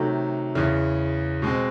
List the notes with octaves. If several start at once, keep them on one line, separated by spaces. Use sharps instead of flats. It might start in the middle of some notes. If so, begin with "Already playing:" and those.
Already playing: C3 D#3 F#3 A3
E2 C#3 E3
B2 G#3 C4